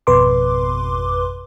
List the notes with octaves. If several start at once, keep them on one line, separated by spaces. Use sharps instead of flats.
G#1 F2 B2 B4 C6 D6